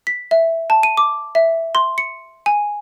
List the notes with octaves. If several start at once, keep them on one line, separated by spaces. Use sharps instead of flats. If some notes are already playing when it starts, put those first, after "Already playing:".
B6
E5
A5
D#7
D6
E5
C6
C#7
G#5